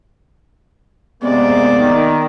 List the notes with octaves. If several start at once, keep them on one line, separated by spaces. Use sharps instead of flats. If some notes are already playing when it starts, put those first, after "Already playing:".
C3 G#3 A#3 B3 D5
D#3